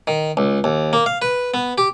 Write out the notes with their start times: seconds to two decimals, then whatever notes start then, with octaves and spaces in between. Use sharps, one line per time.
0.07 D#3
0.37 C#2
0.64 D#2
0.93 A#3
1.06 F5
1.22 B4
1.54 B3
1.78 G4